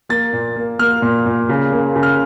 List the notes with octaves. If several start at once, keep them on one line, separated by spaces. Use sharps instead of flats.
A#3 A6
A#2
A#3
A#3 F6
A#2
A#2
C#3
A#3
C#3
F6